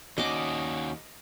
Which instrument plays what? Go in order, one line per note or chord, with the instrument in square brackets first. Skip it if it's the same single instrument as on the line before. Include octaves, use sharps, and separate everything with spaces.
[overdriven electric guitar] D#2 D4 [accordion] C#4 F#4 [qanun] D#5 D6